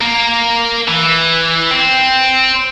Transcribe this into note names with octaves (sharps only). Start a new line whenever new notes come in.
A#3
E3
C4